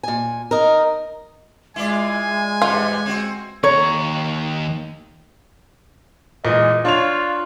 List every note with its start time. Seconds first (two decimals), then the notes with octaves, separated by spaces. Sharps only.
0.03 A#2 G#5
0.51 D#4 A#4
1.76 G#3 E4 F4 D5 G#5
2.62 E2 G#2 G3 F4
3.06 C4 F#4
3.64 D#2 C#5 A#5
6.45 A#2 E3 G#3 D#5
6.85 D4 F4 C#5 F7